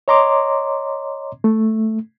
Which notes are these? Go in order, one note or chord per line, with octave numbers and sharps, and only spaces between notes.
C#5 D#5 A#5 C6 D6
A3